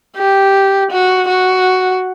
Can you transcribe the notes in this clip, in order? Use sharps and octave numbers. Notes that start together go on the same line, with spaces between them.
G4
F#4
F#4